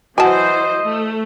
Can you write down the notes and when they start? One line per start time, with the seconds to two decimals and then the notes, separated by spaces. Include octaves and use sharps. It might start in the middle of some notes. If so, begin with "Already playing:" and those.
0.18 E3 F#3 F#4 C5 D#5 F#5 G#5 A5
0.82 A3